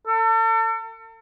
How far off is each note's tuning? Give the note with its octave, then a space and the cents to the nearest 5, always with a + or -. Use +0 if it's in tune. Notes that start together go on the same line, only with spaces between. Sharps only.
A4 +40